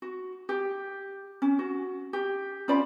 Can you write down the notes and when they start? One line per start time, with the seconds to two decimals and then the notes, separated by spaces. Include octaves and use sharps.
0.02 F#4
0.49 G4
1.42 C#4
1.59 F#4
2.13 G4
2.68 C#4 F4 D5 B5